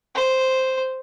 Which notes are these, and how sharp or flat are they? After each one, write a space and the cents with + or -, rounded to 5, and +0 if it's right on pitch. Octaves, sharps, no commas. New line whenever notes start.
C5 -5